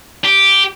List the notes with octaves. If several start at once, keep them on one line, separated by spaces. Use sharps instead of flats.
G4